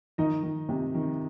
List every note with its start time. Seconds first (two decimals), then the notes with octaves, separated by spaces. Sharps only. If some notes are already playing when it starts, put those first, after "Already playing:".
0.18 D#3 D#4 D#5
0.43 D#3
0.69 C3
0.95 D#3